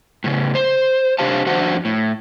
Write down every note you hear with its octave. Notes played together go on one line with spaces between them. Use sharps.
A2 C#3
C5
C3 D4 G4 C5 F5 A5
F2 D4 F#4 C5 F#5
A2